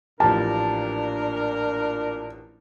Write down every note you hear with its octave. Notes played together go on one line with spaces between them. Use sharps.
A1 A#2 F3 D4 G4 A#4 A5